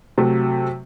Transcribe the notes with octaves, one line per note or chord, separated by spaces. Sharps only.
C3 F#3 A3